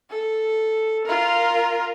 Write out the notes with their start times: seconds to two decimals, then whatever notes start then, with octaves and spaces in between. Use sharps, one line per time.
0.10 A4
1.05 F4 A#4